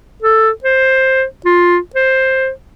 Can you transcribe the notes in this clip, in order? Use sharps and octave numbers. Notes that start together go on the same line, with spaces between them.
A4
C5
F4
C5